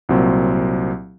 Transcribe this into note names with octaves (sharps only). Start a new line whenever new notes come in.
C2 A#2 F#3 C4